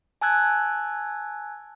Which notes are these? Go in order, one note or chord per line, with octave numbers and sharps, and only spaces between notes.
G#5 A5 E6 F#6 G#6